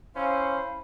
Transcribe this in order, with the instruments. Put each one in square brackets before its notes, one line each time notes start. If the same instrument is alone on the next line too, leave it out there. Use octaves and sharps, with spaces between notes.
[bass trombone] C#4 [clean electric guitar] E4 [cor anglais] C5 [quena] F5